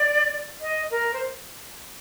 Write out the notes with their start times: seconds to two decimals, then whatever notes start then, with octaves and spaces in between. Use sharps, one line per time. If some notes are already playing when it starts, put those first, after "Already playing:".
Already playing: D5
0.61 D#5
0.91 A#4
1.14 C5